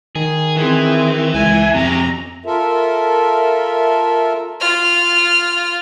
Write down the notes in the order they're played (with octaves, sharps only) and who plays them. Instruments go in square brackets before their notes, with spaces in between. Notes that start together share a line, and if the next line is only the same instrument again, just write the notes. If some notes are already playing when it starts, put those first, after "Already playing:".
[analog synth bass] D#3 [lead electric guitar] G#4
[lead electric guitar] E3 [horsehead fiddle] C4 G#4
[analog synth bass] C#2 [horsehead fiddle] E5 G#5
[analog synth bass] F2 [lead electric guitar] C3 C#4 [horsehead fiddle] A#5
[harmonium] F4 A4 A#4 E5
[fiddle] F4 F6